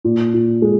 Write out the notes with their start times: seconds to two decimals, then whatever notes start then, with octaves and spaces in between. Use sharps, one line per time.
0.05 A#2
0.34 A#2
0.62 G#3